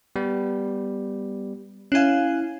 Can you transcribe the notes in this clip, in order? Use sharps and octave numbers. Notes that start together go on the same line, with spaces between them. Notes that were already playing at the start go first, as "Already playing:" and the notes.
G3 B3
C#4 E4 F5 G#5 F#6